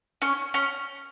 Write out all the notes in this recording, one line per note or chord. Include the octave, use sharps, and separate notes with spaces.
C#4
C#4